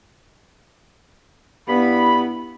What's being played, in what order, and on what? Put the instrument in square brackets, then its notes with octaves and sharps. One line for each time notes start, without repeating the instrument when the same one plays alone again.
[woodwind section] G2 B5 [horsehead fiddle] B3 E4